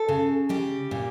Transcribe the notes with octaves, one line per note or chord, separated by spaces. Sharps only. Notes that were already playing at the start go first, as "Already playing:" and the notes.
Already playing: A4
C#3
G3 G4
A#2